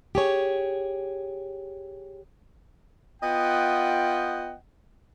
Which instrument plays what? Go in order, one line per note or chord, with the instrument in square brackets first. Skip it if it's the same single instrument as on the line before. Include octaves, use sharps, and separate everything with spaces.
[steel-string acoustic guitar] G4 G#4 C#5
[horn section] B3 F4 D#5 F#5 G5